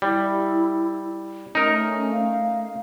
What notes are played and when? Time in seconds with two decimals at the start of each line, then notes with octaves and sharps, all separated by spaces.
0.02 G3 E4
1.55 A3 C#4 D#4 A#4
2.11 F5